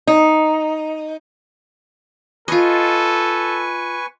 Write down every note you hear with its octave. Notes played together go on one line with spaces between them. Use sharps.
D#4
F4 A4 B4 D#5 G#5 C#6